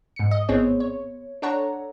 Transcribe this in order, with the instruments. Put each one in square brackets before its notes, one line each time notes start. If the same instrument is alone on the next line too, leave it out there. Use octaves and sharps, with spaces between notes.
[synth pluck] G#2 C#7
D#5
A1 B3 C4 G#4 C#5
C#5
D4 A4 C#5 F#5 A#5